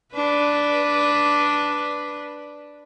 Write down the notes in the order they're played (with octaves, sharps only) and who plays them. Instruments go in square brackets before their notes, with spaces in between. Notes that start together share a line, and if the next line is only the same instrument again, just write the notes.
[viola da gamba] D4 B4